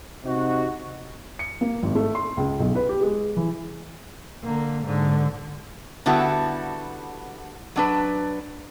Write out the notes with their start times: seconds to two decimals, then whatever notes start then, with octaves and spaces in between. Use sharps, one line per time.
0.24 C3 D#4 F#4
1.39 C#7
1.61 A#3
1.83 G#1
1.95 A3
2.15 C6
2.37 C#2
2.60 B1
2.75 B4
2.89 G4
3.01 G#3
3.36 E3
4.43 D3 A#3
4.84 G#2 D3
6.06 D3 G3 B3 E4 F#4 A4
7.76 F#3 D4 B4